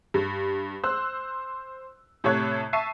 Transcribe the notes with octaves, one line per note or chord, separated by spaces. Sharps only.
G2
C5 E6 F#6
A2 C3 A4 C#5 F#6 G#6
E5 A5 C#6 C7 D#7